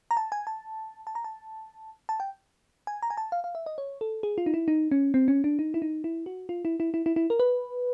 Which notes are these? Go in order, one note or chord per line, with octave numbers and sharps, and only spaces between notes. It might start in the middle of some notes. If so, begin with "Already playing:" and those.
A#5
A5
G#5
A5
A5
A#5
A5
A5
G5
G#5
A#5
G#5
A5
F5
F5
E5
D#5
C#5
A4
G#4
F4
D#4
E4
D#4
C#4
C4
C#4
D4
D#4
E4
D#4
E4
F#4
F4
E4
E4
E4
E4
E4
A#4
B4